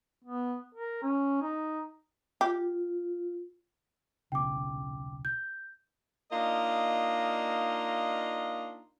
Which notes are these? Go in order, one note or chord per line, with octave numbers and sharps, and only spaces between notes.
B3
A#4
C#4
D#4
F4 G4
D#1 B1 C#3 G5 D6
G6
A#3 D4 D#4 F4 D#5